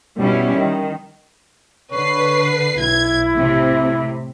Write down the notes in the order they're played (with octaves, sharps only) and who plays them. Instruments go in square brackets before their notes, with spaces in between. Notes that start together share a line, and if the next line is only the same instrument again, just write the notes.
[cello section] B2 G3 C#4 E4
D#3
[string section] D3 B4 C7 [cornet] C#5
[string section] B1 G#6 [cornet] E4
[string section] A2 C3